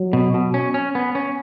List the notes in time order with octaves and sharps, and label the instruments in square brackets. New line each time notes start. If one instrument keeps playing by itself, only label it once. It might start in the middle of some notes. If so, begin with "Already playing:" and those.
Already playing: [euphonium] F#3
[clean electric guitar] B2
B2
C#4
C#4
B3
C#4